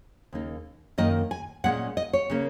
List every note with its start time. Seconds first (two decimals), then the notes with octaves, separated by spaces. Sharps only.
0.33 D#2 C#3 A#3 D#4
0.98 F#2 D#3 A#3 D#5
1.31 G#5
1.64 A#2 G#3 C#4 F#5
1.97 D#5
2.13 C#5
2.30 C#3 A#3 C#4